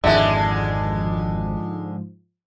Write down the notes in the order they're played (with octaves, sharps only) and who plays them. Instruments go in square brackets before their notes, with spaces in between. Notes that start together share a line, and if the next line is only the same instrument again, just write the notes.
[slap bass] G#1 F2 [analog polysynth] G#2 F3 [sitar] D3 G#3 [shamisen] E4 E5